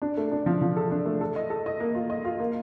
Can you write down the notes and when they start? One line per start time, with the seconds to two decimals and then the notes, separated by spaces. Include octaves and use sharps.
0.02 D4
0.17 A3
0.32 D4
0.46 F3
0.61 F3
0.77 A4
0.91 D4
1.06 A3
1.21 A4
1.36 D#5
1.50 A4
1.66 D#5
1.80 A#3
1.95 F4
2.10 D#5
2.25 F4
2.39 A#3